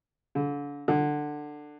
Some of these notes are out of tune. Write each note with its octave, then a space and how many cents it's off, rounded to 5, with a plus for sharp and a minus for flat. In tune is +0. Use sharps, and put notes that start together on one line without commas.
D3 -40
D3 +15